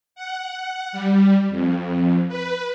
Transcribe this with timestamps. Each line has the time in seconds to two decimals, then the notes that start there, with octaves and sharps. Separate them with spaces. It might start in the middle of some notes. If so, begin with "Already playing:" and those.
0.15 F#5
0.92 G3
1.50 F2
2.28 B4